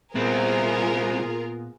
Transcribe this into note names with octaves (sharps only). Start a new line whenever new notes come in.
C2 A#2 B3 C4 F4 G#4 A#4